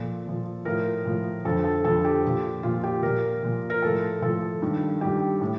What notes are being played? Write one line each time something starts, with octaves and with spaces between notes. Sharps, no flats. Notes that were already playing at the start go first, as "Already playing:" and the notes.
Already playing: A#2 F3 A4
A#2 F3
A2 F3 A#4
A2 F3
F2 D3 F3 A4
A4
F2 D3 F3 A4
G4
A#2 F3
A#2 F3 F4
G4
A#2 F3 A#4
A#2 F3
A#4
A2 F3 A4
A2 F3 A4
G2 D#3
G2 D#3 G4
A2